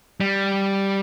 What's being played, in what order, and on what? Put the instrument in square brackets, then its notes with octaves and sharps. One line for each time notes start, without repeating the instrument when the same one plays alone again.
[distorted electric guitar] G3